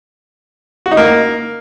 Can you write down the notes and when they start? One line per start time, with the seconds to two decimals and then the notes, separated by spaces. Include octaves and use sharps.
0.86 F#4
0.91 D#4
0.97 A#3